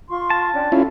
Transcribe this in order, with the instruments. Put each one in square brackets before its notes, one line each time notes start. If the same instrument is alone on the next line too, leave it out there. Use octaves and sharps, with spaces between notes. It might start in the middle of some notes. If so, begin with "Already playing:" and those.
[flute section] F4 C6 C#6
[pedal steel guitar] A5
[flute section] C#4 D4 G5
[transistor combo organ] C#4 E4 F4 [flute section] A4